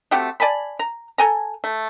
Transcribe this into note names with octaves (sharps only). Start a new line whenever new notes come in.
A3 C4 F#4 G4
D5 G#5 A5 B5
A#5
A4 G#5 A#5
A3